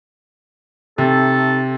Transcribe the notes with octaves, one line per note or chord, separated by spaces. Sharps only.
C3 A3 D#4 A4